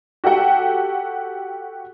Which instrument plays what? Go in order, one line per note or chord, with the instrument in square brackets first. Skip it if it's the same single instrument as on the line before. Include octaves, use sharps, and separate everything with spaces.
[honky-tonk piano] F#4 G4 A4 F#5 G5